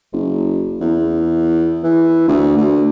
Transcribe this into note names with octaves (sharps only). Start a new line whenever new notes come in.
F#1
E2
E3
D2
D2